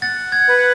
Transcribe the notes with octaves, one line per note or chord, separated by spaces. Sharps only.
F#5 A6
G#6
B4